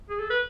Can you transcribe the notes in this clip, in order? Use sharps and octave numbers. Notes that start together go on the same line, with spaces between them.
G#4
A4
B4